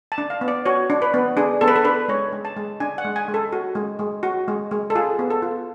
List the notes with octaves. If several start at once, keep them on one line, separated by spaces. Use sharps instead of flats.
A5
D4
F5
B3
D5
F#4 C#5
D4
B4
B3
D4 G#4
B3 A4
B4
A4
D4 B4
G#3 C#5
G#3
A5
G#3
D4 G#5
F#5
G#3
G#5
G#3
A4
F#4
G#3
G#3
F#4
G#3
G#3
A4
F4 G#4
B3
A4
F4